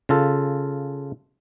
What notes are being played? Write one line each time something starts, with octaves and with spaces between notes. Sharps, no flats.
C#3 F4 A4